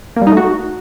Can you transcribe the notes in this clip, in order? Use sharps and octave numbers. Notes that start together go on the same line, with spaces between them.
A#3
G3
D#4
A3
F#4